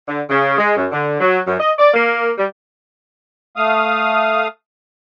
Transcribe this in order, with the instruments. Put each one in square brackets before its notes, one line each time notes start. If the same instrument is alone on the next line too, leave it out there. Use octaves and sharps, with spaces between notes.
[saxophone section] D3
C#3
G#3
F#2
D3
F#3
F#2
D#5
D5
A#3
G3
[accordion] A3 F5 D#6